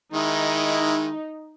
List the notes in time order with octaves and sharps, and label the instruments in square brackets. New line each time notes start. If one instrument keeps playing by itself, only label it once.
[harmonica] D#3 G#3 E4 [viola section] D#4